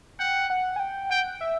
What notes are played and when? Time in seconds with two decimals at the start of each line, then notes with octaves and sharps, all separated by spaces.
0.19 F#5 G5
0.50 F#5
0.76 G#5
0.79 G5
1.10 F#5 G5
1.41 E5